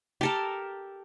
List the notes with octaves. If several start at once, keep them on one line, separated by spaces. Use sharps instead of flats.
G4 A4 A#4